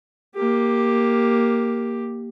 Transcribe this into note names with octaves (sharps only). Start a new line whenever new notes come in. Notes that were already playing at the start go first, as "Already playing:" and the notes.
A#3 G4